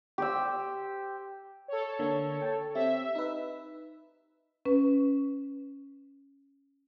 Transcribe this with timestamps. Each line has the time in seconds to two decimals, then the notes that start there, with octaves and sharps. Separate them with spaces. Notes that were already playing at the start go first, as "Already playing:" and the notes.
0.18 G4 C5 E6
1.68 A4 C#5
1.99 D3 A#3
2.42 G5 A5
2.75 C4 G4 E5
3.15 D#4 B4
4.65 C#4 B4